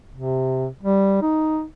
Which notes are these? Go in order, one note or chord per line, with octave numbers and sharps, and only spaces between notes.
C3
G3
D#4